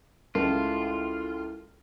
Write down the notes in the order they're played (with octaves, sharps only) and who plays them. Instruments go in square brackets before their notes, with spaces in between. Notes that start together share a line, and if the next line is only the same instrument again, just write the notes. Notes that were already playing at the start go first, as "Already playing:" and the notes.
[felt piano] C#2 A#4 [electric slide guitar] E4 A4 [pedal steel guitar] F4